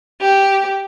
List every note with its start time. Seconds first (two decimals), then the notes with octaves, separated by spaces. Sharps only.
0.22 G4